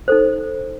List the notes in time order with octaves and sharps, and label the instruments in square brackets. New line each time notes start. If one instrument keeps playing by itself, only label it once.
[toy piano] D#4 A4 C5